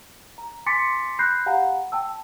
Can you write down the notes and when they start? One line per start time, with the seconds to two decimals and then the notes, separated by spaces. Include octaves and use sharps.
0.38 A#5
0.66 G#5 C6 D6 A6 B6 C#7
1.19 B5 F#6 G6 A#6 C7
1.46 G4 F5 F#5 G#5 A#5 B5
1.92 G5 A5 E6